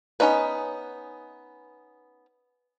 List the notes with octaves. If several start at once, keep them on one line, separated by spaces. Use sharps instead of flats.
B3 C#4 D#4 F#4 B4